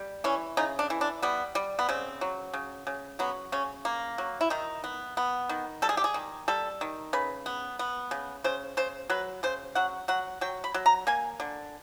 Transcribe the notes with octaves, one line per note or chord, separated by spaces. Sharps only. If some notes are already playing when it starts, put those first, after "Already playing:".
Already playing: G3
E3 C#4
C#3 D#4
D4
E3
D4
G3 B3
G3
B3
C#3 C4
F#3
C#3
C#3
F#3 B3
C#3 C#4
A#3
F#3
E4
D#3 D#4
B3
B3
D#3
G3 A4
G#4
G4
G#4
D#3
G3 A4
D#3
C#3 B4
B3
B3
C#3
C#3 C5
C#3 C5
F#3 B4
C#3 C5
F#3 F#5
F#3 F#5
F#3 G5
B5
F#3
A#5
A#3 G#5
D3